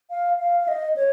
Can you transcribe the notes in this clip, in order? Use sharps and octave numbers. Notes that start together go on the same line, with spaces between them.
F5
F5
F5
D#5
C#5